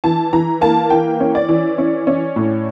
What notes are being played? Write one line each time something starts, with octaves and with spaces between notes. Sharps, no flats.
E3 A5
E3 A#5
A#3 A5
E3 G5
C#4
D5
E3
C#4
C#4
A2